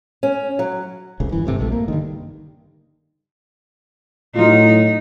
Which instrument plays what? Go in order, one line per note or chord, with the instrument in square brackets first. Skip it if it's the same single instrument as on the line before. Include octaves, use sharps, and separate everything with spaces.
[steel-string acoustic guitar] C#4
F#3
[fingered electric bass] F1 C2 C#3
G1 E3
D1 G2 C3 A3
A#1 C3 F3 A3
A#3
G2 D3 D#3
[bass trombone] A2 [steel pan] F#3 F4 [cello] D#4